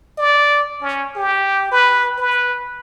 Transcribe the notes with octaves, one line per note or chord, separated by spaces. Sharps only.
D5
C#4
G4
B4
B4